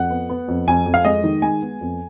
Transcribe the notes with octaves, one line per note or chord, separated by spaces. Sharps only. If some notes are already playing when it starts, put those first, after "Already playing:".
Already playing: F2 F#5
B3
B3
F2
F2 G#5
F2
F5
G#3 D#5
D#3
G#3 G#5
B3
F2